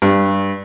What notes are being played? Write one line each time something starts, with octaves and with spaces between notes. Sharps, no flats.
G2